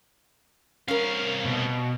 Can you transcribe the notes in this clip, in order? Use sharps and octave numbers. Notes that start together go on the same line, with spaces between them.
C2 C#4 A#4 F5
B2